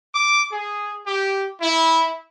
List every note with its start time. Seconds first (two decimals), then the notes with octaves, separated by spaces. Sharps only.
0.13 D6
0.51 G#4
1.06 G4
1.61 E4